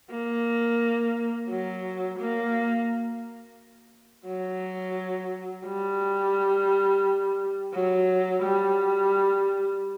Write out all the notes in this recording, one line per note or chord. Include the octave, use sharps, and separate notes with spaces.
A#3
F#3
A#3
F#3
G3
F#3
G3